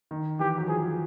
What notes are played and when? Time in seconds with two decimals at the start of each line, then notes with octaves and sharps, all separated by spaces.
0.11 D#3
0.39 E3 G4
0.58 F#3
0.68 F3 G#4